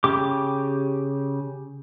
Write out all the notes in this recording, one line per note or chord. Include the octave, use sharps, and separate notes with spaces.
C#3 G4 D6